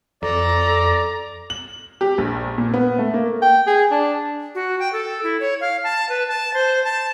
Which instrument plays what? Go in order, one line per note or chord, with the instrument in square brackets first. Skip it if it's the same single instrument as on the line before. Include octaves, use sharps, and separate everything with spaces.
[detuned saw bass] F2 [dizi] A4 [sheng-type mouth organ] D5 [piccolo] A#5
[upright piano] F#7
G4
A#1
A#2
B3
A3
A#3
[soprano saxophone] G5
G#4
D4
[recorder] F#4
G5
A4
E4
C#5
F5
A5
B4
A5
C5
A5